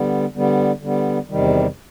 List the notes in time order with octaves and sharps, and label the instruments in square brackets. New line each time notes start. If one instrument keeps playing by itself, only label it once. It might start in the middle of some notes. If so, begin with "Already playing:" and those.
Already playing: [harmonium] D3 G3 B3
D3 G3 B3
D3 G3 B3
E2 C3 D#3 G3